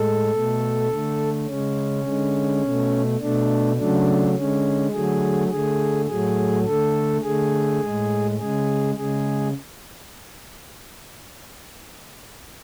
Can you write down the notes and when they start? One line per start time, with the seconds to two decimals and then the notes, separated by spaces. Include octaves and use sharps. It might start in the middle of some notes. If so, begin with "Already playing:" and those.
Already playing: A2 G#3 A4
0.31 B2 A3
0.89 D3 A3
1.46 C#3 G#3 C#4
2.04 D3 G#3
2.62 B2 A3
3.20 B2 A3 D4
3.77 C#3 F#3 A3 D4
4.35 D3 G#3 C#4
4.92 D3 F#3 A3 G#4
5.50 D3 A3 G#4
6.08 A2 F#3 A3 G#4
6.65 D3 A3 A4
7.22 D3 A3 G#4
7.80 A2 G#3
8.39 C#3 G#3 G#4
8.96 C#3 G#3 G#4